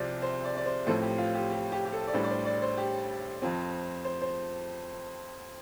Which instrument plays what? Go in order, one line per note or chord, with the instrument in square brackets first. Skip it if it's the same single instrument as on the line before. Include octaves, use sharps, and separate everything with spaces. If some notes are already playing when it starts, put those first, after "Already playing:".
Already playing: [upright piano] C2 C3 F3 C5 D5
C5
D5
D5
C5
A1 A2 F3 C4 A4
G4
F4
G4
G4
G4
G4
A4
D5
A1 A2 G3 D4 C5
D5
C5
D5
C5
G4
F2 F3 C4
C5
C5